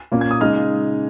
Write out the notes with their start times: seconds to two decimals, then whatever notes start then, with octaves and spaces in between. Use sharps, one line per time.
0.12 A#2 A#3 C#4
0.21 G#6
0.31 D#6
0.41 C#3 G#3 D#4 F6